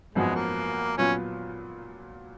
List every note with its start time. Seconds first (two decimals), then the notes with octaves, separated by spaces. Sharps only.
0.15 G#1 F#2 F3 G#3 B3 F#4
0.35 A#3
0.98 A#2 F#3 B3 C#4 F4